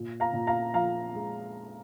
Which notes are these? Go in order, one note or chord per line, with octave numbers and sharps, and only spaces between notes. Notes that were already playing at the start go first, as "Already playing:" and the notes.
Already playing: A#2
F5 A#5
A#2
F5 A#5
F3 F5 A#5
G#3